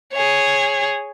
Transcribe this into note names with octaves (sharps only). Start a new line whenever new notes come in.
G#4 C#5